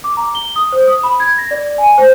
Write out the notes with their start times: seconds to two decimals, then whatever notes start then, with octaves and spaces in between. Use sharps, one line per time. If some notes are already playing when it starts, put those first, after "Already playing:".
0.04 D6
0.17 A#5
0.35 G7
0.56 D#6
0.72 C5
0.87 D#6
1.03 B5
1.20 G#6
1.38 A#6
1.51 D5
1.78 G#5
1.98 C5